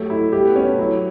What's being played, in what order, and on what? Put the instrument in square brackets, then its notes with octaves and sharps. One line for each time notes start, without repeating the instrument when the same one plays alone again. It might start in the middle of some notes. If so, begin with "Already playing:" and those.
Already playing: [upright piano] F#3 [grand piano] A3 G4
[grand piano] E4
[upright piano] G3 [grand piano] G4
[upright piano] B3
[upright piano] B3 [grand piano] C#4
[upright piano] A3
[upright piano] F#3 [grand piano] E4